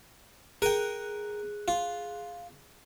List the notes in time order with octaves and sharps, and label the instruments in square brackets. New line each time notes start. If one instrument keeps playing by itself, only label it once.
[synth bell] G#4 F#6 [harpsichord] A#4 G5
[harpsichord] F4